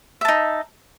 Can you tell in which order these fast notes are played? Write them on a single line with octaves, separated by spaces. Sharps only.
E5 A5 D#4